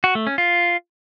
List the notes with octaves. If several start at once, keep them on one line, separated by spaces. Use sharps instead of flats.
F#4
A3
C#4
F4